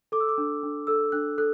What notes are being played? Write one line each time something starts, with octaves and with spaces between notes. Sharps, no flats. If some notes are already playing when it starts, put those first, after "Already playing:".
A4 D6
E6
D6
D4
D4
A4 E6
D4 F#6
A4 F#6